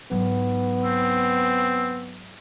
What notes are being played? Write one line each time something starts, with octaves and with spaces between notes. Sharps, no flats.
G#2 F#3 B3
C4